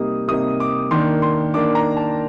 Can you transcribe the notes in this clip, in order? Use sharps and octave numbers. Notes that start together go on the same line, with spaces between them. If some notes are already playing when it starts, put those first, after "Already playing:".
Already playing: C3 G3 A#3 D#4 D#6
C3 G3 A#3 D#4 D#6
D6
D#3 A#3 D4 C6
C6
D#3 A#3 D4 D6
A#5
A5